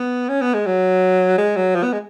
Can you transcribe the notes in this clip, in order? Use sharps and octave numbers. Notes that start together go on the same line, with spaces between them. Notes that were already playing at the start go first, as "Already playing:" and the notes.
Already playing: B3
C#4
B3
G#3
F#3
G#3
F#3
F3
B3
G#3